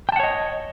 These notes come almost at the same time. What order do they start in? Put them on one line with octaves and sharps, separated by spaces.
G5 A5 F#5 C#5 D#5